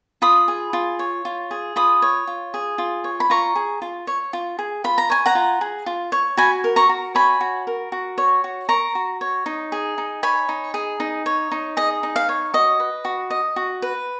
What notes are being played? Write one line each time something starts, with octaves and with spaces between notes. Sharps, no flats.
F4 B5 D#6
G#4
F4
C#5
F4
G#4
F4 B5 D#6
C#5
F4
G#4
F4
C#5
B5
F4 A#5 C#6
G#4
F4
C#5
F4
G#4
F4 B5
A#5
C#5 G#5
F#5 A#5
F4
G#4
F4
C#5
F#4 G#5 B5
A#4
A#5 C#6
F#4
C#5 G#5 B5
F#4
A#4
F#4
C#5
F#4
A#4 A#5 C#6
F#4
C#5
D#4
G#4
D#4
C#5 G#5 B5
D#4
G#4
D#4
C#5
D#4
G#4 D#5
D#4
F5
C#5
F#4 D#5
B4
F#4
D#5
F#4
B4